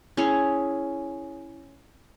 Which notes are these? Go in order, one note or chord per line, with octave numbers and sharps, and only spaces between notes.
C#4 E4 G#4 C#5